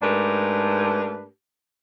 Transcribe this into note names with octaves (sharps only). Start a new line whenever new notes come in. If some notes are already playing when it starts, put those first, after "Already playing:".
G#2 A3 D4 G4 A#4 B4